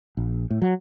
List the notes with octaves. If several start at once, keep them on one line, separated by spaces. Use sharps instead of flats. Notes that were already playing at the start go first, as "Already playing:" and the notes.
A#1
A2
F#3